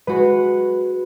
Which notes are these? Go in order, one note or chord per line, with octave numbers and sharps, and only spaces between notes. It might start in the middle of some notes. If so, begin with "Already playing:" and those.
G#3 F#4 B4